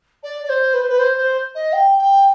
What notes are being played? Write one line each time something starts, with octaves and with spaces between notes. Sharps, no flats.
D5
D5
C5
B4
C5
B4
C5
C5
D#5
G5
G5